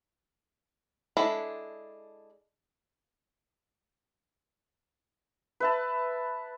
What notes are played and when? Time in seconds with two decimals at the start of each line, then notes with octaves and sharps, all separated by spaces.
1.17 G#3 D4 E4 A4
5.60 B4 E5 A5